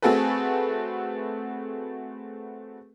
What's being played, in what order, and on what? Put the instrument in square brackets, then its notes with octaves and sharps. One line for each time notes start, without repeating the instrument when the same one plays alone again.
[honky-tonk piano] A3 C4 F#4 G#4 A4 B4